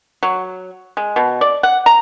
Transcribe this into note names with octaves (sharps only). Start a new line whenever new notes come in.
F#3
G#3
B2
D5
F#5
A#5